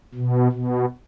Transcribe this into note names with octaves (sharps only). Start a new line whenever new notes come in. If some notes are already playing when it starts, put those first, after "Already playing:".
B2
B2